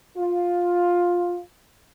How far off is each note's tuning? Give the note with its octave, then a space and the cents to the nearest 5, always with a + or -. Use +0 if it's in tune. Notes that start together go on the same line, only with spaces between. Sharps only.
F4 +10